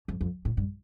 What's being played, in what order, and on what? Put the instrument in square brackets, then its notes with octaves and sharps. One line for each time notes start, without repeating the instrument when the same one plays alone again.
[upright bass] F2
F2
A2
G2